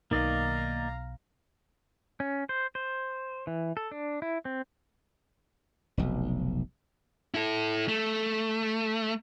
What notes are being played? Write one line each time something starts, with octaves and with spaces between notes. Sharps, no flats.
B1 B2 D#3 A#3 D5 D#5 F5 A#5
C#4
C5
C5
E3
A4
D4
E4
C4
F1 B1
E4 A4
A3